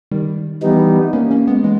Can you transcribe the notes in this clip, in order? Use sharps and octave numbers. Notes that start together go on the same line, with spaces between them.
D#3 G3
E3 G3 B3 D#4
A#3 C#4
A#3 C#4
G#3 B3
E3 G#3